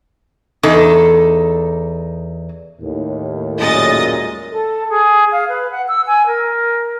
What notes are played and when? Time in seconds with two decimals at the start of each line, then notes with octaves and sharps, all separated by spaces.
0.63 E2 D#4 A4
2.81 D#2 A2
3.59 F#2 A#2 G#3 D#5 D#6 A6
4.52 A4
4.90 G#4
5.32 F5
5.49 B4
5.72 F#5
5.88 E6
6.07 G#5
6.27 A#4